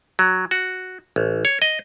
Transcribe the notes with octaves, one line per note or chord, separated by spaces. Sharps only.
F#3
F#4
A1
C#5
D#5